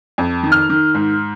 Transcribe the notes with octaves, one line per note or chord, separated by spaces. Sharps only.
F2
D#3
F6
D#3
G#2